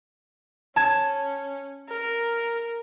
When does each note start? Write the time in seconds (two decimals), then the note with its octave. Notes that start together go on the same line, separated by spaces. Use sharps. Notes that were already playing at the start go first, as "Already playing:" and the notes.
0.76 C#4 A5 G#6
1.88 A#4